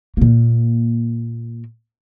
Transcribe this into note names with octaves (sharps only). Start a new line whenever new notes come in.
A#2 A#3